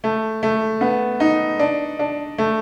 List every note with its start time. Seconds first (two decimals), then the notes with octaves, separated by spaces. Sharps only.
0.04 A3
0.43 A3
0.81 B3
1.20 D#4
1.59 D4
1.99 D4
2.38 A3